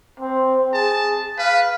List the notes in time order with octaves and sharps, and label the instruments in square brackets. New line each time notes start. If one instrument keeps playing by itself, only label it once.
[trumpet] C4
[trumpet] G#4 [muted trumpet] A5
[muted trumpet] B4 [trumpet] F5